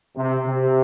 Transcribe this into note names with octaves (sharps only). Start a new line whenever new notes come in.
C3
C3